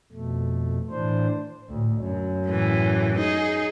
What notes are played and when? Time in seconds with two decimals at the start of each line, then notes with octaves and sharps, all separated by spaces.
0.12 F2 B2 A3
0.91 A2 E3 D4 C5
1.69 D2 A2
2.01 F#2
2.47 A2 E3
3.16 D#4 G#4